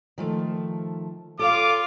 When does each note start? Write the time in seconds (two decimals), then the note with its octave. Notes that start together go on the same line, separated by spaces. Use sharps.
0.18 D#3 F3 A3
1.39 F4 A4 C#5 F5 D6